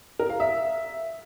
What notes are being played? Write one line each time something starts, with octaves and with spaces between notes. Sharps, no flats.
A#4
F5
E5